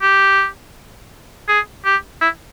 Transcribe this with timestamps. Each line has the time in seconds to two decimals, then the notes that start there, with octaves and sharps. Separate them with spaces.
0.02 G4
1.48 G#4
1.85 G4
2.21 E4